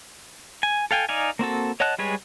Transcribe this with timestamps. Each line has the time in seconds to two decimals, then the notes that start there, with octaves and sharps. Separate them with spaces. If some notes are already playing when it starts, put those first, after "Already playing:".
0.63 G#5
0.91 A4 F5 G5 G#5
1.09 D#4 D5 F5 G#5
1.39 A#3 C4 F#4 A4
1.80 C#5 D#5 F#5 A5 F#6
1.98 G3 G#3 G#4 B4 C#5